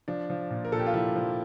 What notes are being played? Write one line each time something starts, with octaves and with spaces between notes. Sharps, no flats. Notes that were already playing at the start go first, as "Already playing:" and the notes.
F3 D4
F3
A#2
A#4
A#2 A4
G4
F4
F3 E4
F3